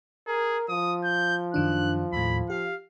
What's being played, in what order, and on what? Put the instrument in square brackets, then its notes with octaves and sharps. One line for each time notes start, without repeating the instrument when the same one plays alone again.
[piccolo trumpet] G#4 [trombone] A#4
[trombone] F3 [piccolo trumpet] D#6
[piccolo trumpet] G6
[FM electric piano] F#2 D#3 D4 [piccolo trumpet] F#6
[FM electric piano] D#2 A2 [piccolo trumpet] B5
[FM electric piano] G4 [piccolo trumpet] F5